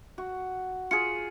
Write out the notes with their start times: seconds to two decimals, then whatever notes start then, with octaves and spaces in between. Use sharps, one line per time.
0.18 F#4
0.91 F4 G#4 C#7